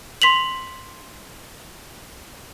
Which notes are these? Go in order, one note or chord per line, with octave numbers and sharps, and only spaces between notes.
C6 B6 F7 F#7